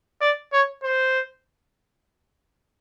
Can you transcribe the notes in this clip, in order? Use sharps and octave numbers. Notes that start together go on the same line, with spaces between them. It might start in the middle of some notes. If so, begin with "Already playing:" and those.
D5
C#5
C5